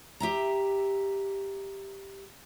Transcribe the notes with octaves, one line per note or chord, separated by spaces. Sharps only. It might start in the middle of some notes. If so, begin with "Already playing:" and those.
G4 E5 A#5